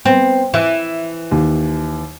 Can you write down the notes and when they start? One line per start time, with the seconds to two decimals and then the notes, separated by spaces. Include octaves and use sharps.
0.05 B3 C4
0.54 E3 E5
1.31 D#2